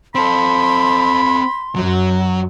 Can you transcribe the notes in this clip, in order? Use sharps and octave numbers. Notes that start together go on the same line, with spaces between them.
C4 A4 B5 C6
F#2 F#3